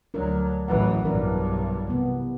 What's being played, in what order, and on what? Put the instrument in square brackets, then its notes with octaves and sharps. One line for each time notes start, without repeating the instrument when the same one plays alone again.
[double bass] D2 F#3 [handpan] D4 A#4
[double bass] A1 E3 [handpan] F#3 B4 F#5
[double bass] B1 G2 [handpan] E3 D4 A#4
[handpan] C3 E3 B3